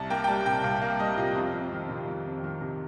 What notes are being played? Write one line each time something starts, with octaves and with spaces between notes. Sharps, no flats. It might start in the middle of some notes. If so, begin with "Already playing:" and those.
Already playing: C2 A5
A#3 G5
G5
G3 A5
C3 G5
C2 F5
A#3 F5
G3 D#5
C3 F4
F2 F4
F2
D#3
C3
F2
F2
D#3
C3